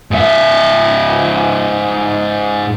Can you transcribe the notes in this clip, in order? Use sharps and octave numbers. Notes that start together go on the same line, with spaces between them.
G#2 E5